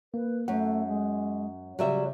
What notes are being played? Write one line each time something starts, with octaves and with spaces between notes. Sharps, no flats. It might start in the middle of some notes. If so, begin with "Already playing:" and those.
A#3 B4
F#2 A3 F#5
G#3
C#3 F#3 G3 E5